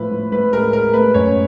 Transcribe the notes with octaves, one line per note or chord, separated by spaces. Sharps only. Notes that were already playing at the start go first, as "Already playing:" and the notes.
Already playing: A2 F3 B4
A2
A2 B4
G#3 A#4
G#3 A#4
A3 B4
F#2 C#5